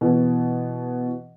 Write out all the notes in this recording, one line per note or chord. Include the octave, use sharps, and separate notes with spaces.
B2 E3